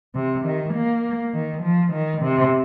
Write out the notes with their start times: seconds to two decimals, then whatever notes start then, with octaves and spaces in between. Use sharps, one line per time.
0.15 C3
0.45 D#3
0.74 A#3
1.33 D#3
1.62 F3
1.93 D#3
2.22 C3